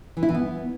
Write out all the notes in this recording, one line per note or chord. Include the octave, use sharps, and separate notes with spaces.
E3
E4
E3
B3